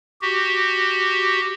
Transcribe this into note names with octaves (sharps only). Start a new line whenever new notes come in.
F#4 G4